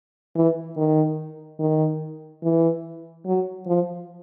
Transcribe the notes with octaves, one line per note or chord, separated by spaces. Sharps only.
E3
D#3
D#3
E3
F#3
F3